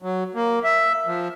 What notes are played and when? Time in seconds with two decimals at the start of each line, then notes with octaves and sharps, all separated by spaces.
0.02 F#3
0.35 A#3
0.64 E5
1.07 F3